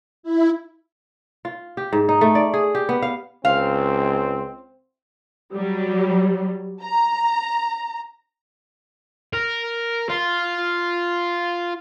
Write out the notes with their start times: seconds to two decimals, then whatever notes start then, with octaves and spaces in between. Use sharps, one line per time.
0.23 E4
1.45 F4
1.77 G4
1.93 G#2
2.09 D#4
2.21 A3
2.35 D5
2.54 G#4
2.75 G4
2.89 B3
3.02 F5
3.45 C#2 C4 F5
5.55 F#3 G3
6.83 A#5
9.33 A#4
10.09 F4